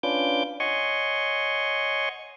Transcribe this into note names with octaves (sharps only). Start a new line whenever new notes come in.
C#4 D4 F4 B4 D6 G6
C#5 D#5 F#5 G#5 C6 C#6